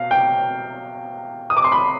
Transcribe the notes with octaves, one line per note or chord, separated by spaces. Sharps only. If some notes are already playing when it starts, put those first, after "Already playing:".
Already playing: B2 F5
G5
D#6
D6
C6
B5